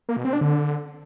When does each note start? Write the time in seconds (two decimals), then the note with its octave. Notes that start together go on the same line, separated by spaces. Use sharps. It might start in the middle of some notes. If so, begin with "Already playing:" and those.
0.09 A#3
0.17 B2
0.25 C4
0.33 D4
0.41 D3